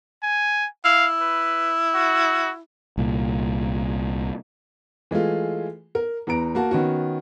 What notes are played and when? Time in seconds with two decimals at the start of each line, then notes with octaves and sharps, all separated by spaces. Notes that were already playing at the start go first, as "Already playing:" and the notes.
0.23 G#5
0.85 E4 F5
1.21 B4
1.95 F#4
2.98 C2 A#2
5.11 E3 G#3 A3 F4
5.95 A#4
6.27 E2 B4 A#5 D7
6.55 A#3 F#4 A5
6.71 D#3 B3 C#4 F#4